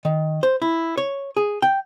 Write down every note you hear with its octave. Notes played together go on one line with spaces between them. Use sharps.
D#3
C5
E4
C#5
G#4
G5